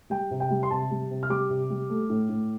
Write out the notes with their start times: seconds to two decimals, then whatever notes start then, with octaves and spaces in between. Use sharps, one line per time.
0.10 G3 G5
0.31 C3
0.40 G5
0.50 G3
0.63 C6
0.71 C3 A5
0.91 G3
1.11 C3
1.23 F6
1.30 G3 D6
1.50 C3
1.70 G3
1.90 A3
2.10 A2
2.29 A2